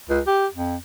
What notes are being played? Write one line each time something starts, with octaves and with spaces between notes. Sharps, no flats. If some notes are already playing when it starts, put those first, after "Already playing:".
C#2
G4
F2